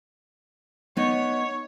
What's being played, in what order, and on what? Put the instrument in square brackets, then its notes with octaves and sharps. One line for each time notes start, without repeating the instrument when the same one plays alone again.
[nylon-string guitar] B3 D#4 [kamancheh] C#5